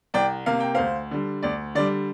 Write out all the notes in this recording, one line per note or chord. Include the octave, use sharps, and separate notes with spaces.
C2 D5 G5
C3 A#3 F5
G5
D2 C5 F5
D3 G3
D2 D5
D3 G3 D5